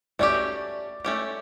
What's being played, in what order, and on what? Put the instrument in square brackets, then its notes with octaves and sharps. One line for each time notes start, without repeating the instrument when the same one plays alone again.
[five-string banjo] A3 C#4 G4 [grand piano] D5
[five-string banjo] A3 C#4 G4